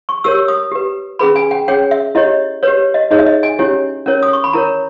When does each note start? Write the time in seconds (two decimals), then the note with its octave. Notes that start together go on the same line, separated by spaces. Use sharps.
0.09 C#6
0.24 G4 A#4 C#5 E6
0.48 D#6
0.71 G4 B4
1.19 C#4 G#4 B4 B5
1.36 G#5
1.51 G5
1.68 C#4 G#4 C#5 G5
1.91 E5
2.15 E4 G4 C#5 D#5
2.63 G4 B4 C#5
2.94 D#5
3.11 D#4 G#4 C#5 D#5
3.19 E5
3.26 D#5
3.43 G#5
3.59 C#4 E4 G4 C#5
4.06 C#4 E4 A#4 C#5
4.23 D#6
4.33 C#6
4.44 B5
4.53 E4 A#4 C#5 A#5